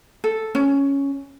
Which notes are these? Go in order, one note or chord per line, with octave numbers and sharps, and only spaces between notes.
A4
C#4